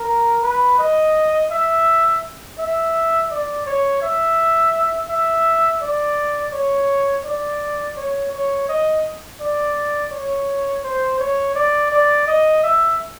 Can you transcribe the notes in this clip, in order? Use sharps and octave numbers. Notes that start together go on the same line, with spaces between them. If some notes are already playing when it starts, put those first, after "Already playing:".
Already playing: A#4
B4
D#5
E5
E5
D5
C#5
E5
E5
D5
C#5
D5
C#5
C#5
D#5
D5
C#5
C5
C#5
D5
D5
D#5
E5